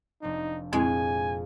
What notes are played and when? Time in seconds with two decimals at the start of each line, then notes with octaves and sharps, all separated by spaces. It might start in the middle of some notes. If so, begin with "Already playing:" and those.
0.22 F1 C4 D4 D#4
0.73 F2 A#2 G#3 A3 C4 E4 G#5